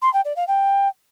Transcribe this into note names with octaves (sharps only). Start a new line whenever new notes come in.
C6
G5
D5
F5
G5